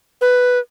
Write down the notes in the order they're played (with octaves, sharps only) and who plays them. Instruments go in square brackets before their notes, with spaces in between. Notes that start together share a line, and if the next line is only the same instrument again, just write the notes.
[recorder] B4